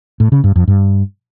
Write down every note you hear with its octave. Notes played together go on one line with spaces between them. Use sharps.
A2
C#3
G2
F2
G2